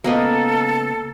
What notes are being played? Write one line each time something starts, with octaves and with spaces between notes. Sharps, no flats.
C#2 A#3 B3 A4 D#5